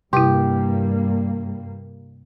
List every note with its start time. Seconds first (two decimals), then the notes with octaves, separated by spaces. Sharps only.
0.13 G2 C3 G3 A#3 E4 G4